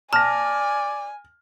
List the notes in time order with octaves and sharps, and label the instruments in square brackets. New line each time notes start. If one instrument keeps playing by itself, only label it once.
[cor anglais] D5 [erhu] G#5 [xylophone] A5 [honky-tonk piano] F6 A#6